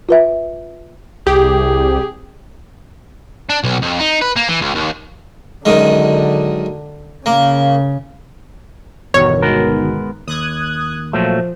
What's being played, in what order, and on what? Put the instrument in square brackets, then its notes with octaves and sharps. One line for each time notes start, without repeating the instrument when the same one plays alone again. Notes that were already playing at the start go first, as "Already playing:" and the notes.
[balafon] F4 B4 E5
[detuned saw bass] C2 [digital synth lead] G4 [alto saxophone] G#4
[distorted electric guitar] D4
B1
F2
D#4
B4
A#3
E3
C#2
D#2
[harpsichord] F#2 D#3 G#3 [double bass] D3
[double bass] C#3 [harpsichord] A#3
[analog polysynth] G1 B2 D#3 [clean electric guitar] E2 [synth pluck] C#5
[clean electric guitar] G#3 B3 A#4
[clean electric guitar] D#2 [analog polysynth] D#6 F#6 G#6
[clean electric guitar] A#2 F#3 A3 [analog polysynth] F3